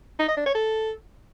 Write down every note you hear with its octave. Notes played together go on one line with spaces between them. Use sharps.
D#4
D#5
D4
C#5
A4